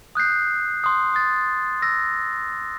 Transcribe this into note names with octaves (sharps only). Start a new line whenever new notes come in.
D#6 F#6 G6 C7
C6 D#6
D#6 A6
E6 A#6